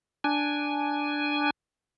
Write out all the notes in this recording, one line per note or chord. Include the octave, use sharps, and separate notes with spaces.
D4 G#5